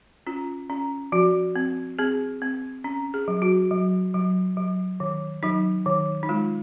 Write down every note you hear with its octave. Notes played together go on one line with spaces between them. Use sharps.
C#4 F4
C#4
F3 F#4
C4
C4 G#4
C4
C#4
G#4
F#3
F#4
F#3
F#3
F#3
D#3
F#3 D#4
D#3
D#4
G#3 F4